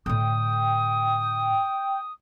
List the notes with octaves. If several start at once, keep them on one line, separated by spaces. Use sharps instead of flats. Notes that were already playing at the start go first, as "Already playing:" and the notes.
A2 D3 G5 D#6